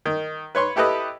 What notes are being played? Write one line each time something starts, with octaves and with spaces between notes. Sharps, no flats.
D#3
B4 C#5 C6 C#6
E4 G4 A4 B4 D#5